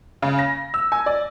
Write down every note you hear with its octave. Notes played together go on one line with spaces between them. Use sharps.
C#3
A#6
E6
G#5
D5